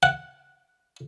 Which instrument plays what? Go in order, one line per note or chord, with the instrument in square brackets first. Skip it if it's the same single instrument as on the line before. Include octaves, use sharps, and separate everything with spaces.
[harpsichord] F#5